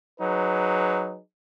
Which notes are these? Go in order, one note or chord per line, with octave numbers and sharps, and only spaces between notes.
F#3 D#4 G#4 B4